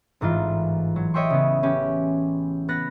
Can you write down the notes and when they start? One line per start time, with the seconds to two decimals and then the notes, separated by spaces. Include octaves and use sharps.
0.21 A1 G#2 E3 F4
0.96 F#3
1.14 C#5 D#5 E5 G5 C6 C#6
1.30 C#3 B3
1.63 E3 C#4 G4
2.68 B3 F#6 A#6 B6